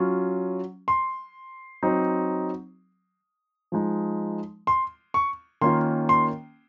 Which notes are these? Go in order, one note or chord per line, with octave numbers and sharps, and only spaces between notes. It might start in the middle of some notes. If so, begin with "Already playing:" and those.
Already playing: F#3 C#4 F4
C6
F#3 C4 D#4
F3 G#3 D#4
C6
C#6
D#3 A#3 C#4 F4 C6
C6